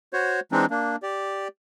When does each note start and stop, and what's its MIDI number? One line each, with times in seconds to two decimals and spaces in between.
0.13 0.40 66
0.13 0.40 72
0.13 0.40 73
0.52 0.65 52
0.52 0.65 56
0.52 0.65 60
0.52 0.65 62
0.52 0.65 63
0.70 0.96 58
0.70 0.96 62
1.03 1.48 67
1.03 1.48 74